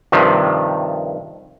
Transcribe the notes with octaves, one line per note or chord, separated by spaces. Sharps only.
G2 C3 D#3 F3